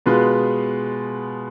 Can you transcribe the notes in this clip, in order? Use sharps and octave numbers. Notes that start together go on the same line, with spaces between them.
B2 G#3 B3 F4 B4